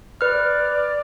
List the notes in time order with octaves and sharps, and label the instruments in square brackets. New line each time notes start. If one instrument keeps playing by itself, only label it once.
[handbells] B4 F6 [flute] D5